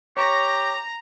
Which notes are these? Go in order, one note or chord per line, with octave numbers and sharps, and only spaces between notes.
G4 C#5 A#5